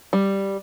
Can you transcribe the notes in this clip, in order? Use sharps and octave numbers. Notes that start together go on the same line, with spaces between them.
G3